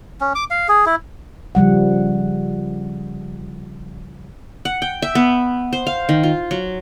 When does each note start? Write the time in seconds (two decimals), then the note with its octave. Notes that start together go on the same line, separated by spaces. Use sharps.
0.21 C#4
0.35 D6
0.50 F5
0.69 G#4
0.86 E4
1.55 C#3 F3 G3 F#5
4.65 F#5
4.82 G5
5.02 E5
5.15 B3
5.73 C5
5.87 F5
6.09 D#3
6.23 F4
6.51 F#3